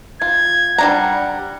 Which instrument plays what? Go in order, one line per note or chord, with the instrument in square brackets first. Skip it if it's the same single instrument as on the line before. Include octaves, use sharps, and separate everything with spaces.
[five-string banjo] F4 [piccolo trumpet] G#6
[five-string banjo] G3 D4 A#5 [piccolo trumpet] F#5